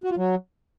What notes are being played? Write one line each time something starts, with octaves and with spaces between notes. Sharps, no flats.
F#4
F4
F#3